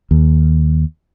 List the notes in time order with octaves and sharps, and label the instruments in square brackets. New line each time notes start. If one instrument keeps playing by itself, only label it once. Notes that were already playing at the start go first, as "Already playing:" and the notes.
[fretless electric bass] D#2